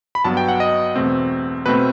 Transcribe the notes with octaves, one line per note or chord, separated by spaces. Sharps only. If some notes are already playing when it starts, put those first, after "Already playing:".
B5
G2 F#3 B3 A5
G5
F#5
D#5
E2 B2 A3 C4
B2 A3 C4 B4